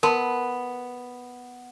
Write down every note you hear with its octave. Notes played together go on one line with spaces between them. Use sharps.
B3 A#4 A5 C6